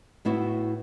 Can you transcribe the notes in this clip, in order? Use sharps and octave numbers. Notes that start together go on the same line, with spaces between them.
A2 B3 E4 F#4